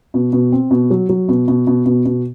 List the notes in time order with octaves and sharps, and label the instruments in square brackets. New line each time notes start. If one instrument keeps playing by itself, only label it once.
[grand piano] B2
B2
C4
B2
F#3
F#3
B2
B2
B2
B2
B2